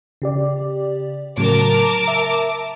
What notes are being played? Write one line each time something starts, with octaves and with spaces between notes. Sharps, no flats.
C#3 G4 D5
A2 C#3 F#3 A#4 A5 D6
E5